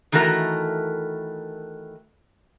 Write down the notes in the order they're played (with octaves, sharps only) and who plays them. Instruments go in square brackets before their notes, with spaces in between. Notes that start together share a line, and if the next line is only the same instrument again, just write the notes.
[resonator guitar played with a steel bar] D#3 E3 A3 F#4 A#4